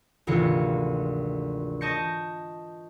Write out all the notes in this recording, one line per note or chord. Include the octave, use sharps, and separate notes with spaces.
G#1 D2 C3 E3 F4 C#7
D#5 A5 C#6 G6 A#6 C#7